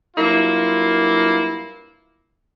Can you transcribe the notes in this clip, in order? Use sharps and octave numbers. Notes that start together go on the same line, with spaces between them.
G2 F#3 A#3 E4 F4